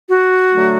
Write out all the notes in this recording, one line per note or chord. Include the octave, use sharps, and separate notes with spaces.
F#4
D3 F#3 A3